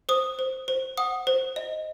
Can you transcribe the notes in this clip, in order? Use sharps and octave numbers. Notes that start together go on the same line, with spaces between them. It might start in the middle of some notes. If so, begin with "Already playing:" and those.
C5 D#6
C5
C5
F#5 D#6
C5
D#5